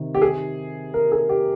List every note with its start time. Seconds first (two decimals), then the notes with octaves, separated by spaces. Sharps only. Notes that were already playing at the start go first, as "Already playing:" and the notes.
Already playing: C3 D#3
0.15 G4
0.22 G#4
0.94 A#4
1.12 G#4
1.29 G4